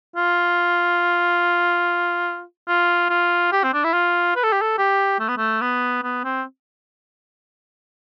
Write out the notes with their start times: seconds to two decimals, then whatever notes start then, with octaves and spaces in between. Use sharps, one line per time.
0.16 F4
2.68 F4
3.10 F4
3.52 G4
3.64 C4
3.74 D4
3.84 E4
3.94 F4
4.36 B4
4.44 A4
4.53 G4
4.61 A4
4.78 G4
5.20 A3
5.29 B3
5.37 A3
5.61 B3
6.03 B3
6.24 C4